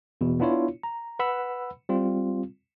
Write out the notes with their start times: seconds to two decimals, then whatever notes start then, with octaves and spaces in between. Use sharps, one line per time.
0.21 E2 B2
0.40 B3 D4 E4 F4 C#5
0.83 A#5
1.19 B4 F#5 B5 E6
1.89 G3 C4 F4